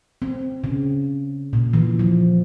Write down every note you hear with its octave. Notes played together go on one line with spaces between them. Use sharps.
C4
C#3
A#2
E3
F3